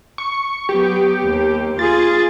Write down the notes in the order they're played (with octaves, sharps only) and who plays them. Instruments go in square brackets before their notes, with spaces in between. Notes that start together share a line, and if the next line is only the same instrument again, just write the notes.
[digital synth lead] C#6
[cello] F#3 B3 [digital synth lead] G4
[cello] D#2
[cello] F4 G#4 [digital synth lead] A6